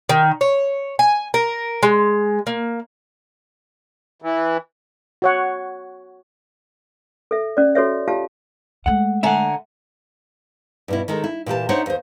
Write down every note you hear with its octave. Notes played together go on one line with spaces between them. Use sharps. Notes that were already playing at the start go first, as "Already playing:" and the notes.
D#3
C#5
G#5
A#4
G#3
A#3
E3
F#4 C#5 F#5
A4 E5
C#4 D5
F#4 A4 C#5 E5
F4 G4 F5 A5
G#3 A3 F#5
D3 E5 F#5 G#5 A#5
G2 B2 E4
D#3 G#3 A4 A#4
E4
A#2 E3 G4 A5
D4 D#4 C5 C#5 E5 F#5
D#2 C5